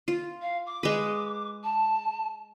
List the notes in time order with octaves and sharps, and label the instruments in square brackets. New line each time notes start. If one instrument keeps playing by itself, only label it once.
[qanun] F4
[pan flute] F5
D6
[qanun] G#3 B4
[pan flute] A5